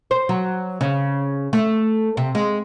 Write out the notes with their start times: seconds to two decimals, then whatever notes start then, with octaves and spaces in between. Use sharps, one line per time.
0.11 C5
0.29 F#3
0.81 C#3
1.53 A3
2.17 C3
2.35 G#3